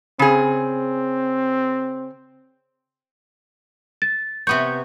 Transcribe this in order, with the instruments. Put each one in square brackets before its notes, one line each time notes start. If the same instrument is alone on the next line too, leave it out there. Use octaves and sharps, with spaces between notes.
[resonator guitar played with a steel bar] C#3 G#4 [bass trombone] C4
[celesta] A6
[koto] C3 B3 C#5 [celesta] G6